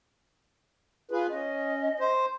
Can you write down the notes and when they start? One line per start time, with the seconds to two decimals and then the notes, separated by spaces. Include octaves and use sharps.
1.11 F4 G#4 B4
1.30 C#4 D#5
2.00 C5